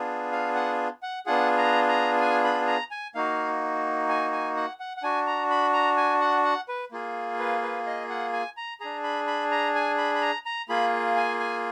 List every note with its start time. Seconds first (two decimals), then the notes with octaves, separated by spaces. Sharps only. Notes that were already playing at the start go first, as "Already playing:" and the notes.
Already playing: B3 D4 F4 G#4
0.32 F5
0.55 F#5
1.03 F#5
1.26 B3 D4 F4 G#4 F#5
1.58 A#5
1.89 A#5
2.20 G#5
2.44 B5
2.67 A#5
2.91 G#5
3.15 A#3 D#4 F#4 F5
4.09 G#5
4.32 G#5
4.57 F#5
4.80 F#5
4.97 F#5
5.03 D4 F#4 G#5
5.27 A#5
5.50 B5
5.73 A#5
5.97 G#5
6.21 F#5
6.44 F#5
6.68 B4
6.92 A#3 F4 G#4
7.39 B4
7.62 B4
7.87 D#5
8.10 F#5
8.33 G#5
8.57 A#5
8.80 D4 G#4 A#5
9.04 B5
9.27 B5
9.51 A#5
9.75 G#5
9.98 B5
10.15 B5
10.22 A#5
10.46 A#5
10.69 A#3 F4 G#4 B5
11.16 G#5
11.40 G#5